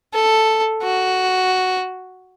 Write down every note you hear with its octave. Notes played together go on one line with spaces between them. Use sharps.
A4
F#4